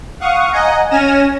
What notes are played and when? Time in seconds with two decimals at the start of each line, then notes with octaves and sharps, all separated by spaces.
0.20 F5 F#5 C#6 D#6
0.52 D#5 F#5 G#5 A#5
0.90 C#4 G#5 F6 A#6 D#7 E7